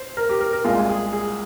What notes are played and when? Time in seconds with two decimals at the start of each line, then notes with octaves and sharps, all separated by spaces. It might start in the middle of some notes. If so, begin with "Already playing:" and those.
Already playing: C5
0.17 A#4
0.29 G4
0.40 A#4
0.53 A#4
0.64 C2 A#2 G#3 F4
0.89 G#4
1.13 G#4